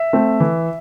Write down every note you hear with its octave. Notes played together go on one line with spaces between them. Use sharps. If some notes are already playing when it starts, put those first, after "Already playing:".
Already playing: E5
A3 C4
E3